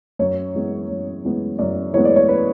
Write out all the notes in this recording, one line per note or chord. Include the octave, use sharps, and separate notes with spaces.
F#2 C#5
E3 G#3 B3
F#2
E3 G#3 B3
F#2 D5
E3 G#3 B3 C#5
D5
C#5
B4